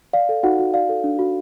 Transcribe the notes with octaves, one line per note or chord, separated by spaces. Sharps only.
D5 F5
A4
D#4 F#4 F#5
F#4
D5 F5
A4
D4
F#4